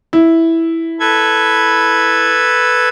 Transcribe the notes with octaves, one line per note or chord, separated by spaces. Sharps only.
E4
A4 B4 G#6